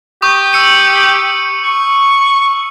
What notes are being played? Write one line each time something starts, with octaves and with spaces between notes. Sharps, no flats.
G4 C#6 D#6
E6 C#7 D#7
C#6